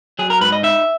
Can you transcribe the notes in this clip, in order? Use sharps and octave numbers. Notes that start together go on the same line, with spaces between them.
F#3 G#4
A#4
G#2 B4
D#5
D#4 E5